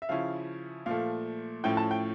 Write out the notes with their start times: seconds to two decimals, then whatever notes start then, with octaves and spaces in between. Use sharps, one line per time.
0.02 E5
0.09 C#3 F3 C#4 E4 F5
0.86 A#2 F3 A3 F5
1.64 A2 F3 C#4 E4 G5
1.77 A5
1.91 G5